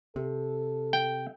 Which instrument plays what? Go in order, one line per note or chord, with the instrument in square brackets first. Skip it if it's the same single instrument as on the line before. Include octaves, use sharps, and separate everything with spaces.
[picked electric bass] C3 [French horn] A4
[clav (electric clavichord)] G5